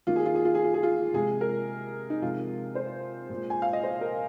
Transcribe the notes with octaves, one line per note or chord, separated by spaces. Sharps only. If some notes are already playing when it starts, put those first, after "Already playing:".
D#3 A#3 F4
G#4
F4
G#4
F4
G#4
F4
G#4
F4
C3 F3 G#3 G#4
A#4
D#4
C3 F3 G#3 F4
C5
A#2 G#3
G#5
F5
D#5
C5
A#4